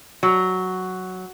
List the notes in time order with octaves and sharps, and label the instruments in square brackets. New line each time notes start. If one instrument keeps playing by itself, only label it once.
[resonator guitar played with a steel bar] F#3